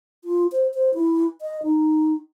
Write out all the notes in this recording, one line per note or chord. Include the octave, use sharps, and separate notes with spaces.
F4
C5
C5
E4
D#5
D#4